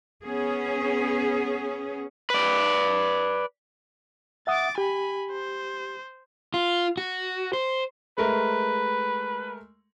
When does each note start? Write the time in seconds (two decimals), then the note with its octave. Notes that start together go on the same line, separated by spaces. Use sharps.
0.22 B3 C#4 G#4
2.30 B4 D5
4.47 E5 F#5 D6 D#6 A6
4.78 G4 G#5 B5
5.32 C5
6.54 F4
6.97 F#4
7.53 C5
8.18 G#3 A3 A#4 B4